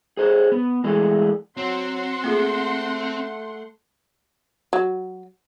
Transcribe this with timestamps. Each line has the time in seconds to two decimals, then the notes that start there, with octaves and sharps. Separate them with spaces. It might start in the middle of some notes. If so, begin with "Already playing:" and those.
0.17 G#4 C5 C#5
0.52 B3
0.84 E3 G#3 A3
1.57 F#3 C4 F#5 C6
2.24 A3 A#3 F4 G#4
4.73 F#3